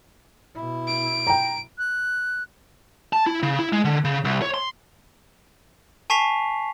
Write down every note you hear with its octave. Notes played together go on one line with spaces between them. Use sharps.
B2 E4
D7
G5 A#5
F#6
A5
E4
C#3
E4
G#3
D3
C#3
C2
C#5
C6
G#5 A5 C#6 B6 C7 F7